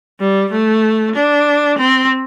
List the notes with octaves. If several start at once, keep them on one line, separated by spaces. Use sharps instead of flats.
G3
A3
D4
C4